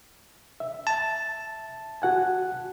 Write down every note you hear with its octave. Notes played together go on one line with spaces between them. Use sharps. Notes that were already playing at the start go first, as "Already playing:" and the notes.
E5
A5
F#4 F#5 G#5